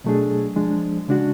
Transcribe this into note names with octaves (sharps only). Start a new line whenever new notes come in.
B2 F#3 A3 D4 G#4
F3 G#3 D4
C#3 G#3 D4 F#4